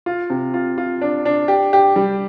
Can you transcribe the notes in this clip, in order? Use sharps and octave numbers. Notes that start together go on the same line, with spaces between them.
F4
C3
F4
F4
D4
D4
G4
G4
G3